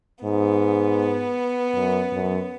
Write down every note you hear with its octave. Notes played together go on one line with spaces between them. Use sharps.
G#2 B3
F#2
F#2